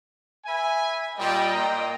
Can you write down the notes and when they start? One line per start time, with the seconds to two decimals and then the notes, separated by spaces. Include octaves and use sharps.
0.45 B4 E5 G#5
1.19 A#2 G3 D#5 G5
1.53 A#2 A#5